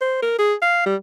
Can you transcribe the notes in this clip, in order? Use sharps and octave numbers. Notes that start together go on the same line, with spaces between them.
C5
A#4
G#4
F5
G3